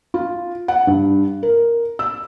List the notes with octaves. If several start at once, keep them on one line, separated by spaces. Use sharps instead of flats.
F4
F#5
G2
A#4
E6